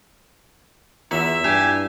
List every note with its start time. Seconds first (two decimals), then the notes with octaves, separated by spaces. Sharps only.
1.11 E2 F4 E5 E7
1.44 G2 E4 G4 G#5